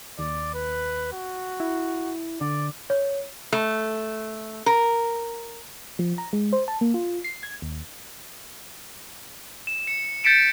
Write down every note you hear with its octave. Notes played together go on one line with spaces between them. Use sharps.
D#2 D5
B4
F#4
E4
D3 D5
C#5
A3
A#4
F3
A#5
G#3
C5
A5
A#3
F4
C7
G#6
D#2
E7
C#7
G6 A6 B6 C#7 D7 E7